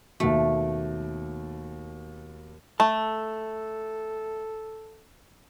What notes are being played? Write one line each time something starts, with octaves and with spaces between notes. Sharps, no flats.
D#2 B2 A3
A3 A4 A5